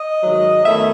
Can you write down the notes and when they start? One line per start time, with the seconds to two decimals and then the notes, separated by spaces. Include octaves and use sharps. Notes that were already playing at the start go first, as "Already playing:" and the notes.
Already playing: D#5
0.23 G#2 D#3 F#3
0.65 E2 D#3 A3 E4 E5